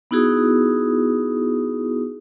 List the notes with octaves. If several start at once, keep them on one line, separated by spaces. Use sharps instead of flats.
B3 D#4 E4 F#4 G#4 D#6